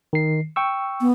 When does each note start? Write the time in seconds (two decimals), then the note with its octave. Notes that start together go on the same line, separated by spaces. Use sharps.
0.13 D#3 C7
0.56 G5 C#6 E6
1.01 B3